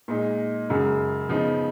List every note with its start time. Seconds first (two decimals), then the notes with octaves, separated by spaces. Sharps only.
0.08 A#2 G#3 D#4
0.69 F#2 C#3 G#3
1.29 C#3 F3 B3 D#4